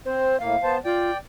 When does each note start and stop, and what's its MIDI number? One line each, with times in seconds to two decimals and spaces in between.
0.05 0.36 60
0.05 0.40 72
0.40 0.56 45
0.40 0.56 58
0.40 0.76 77
0.63 0.78 59
0.63 0.78 72
0.63 0.78 81
0.85 1.11 65
0.85 1.17 74
0.85 1.17 79